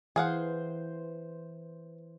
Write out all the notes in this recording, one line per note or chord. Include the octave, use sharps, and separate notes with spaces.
E3 G#4 C5 F5 F#5